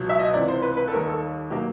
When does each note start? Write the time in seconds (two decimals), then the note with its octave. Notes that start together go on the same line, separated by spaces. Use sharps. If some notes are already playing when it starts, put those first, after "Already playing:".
Already playing: C#2 B2 F#3
0.09 E5
0.19 D#5
0.33 C#2 C3 E3 D5
0.48 C5
0.62 B4
0.77 B4
0.88 A4
0.92 D#2 D#3 G3 A#4
1.07 A4
1.50 B2 F#3 A#3 G4